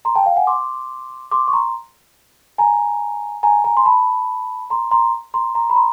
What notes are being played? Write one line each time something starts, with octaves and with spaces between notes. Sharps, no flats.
A#5 C6
G5 A5
F5 G5
F#5 G#5
C6 D6
C6 D6
C#6
A#5 C6
G#5 A#5
G#5 A#5
G#5 A#5
C6
A5 B5
A#5 C6
A#5 C6
A#5 C6
A#5 C6
B5
A#5 C6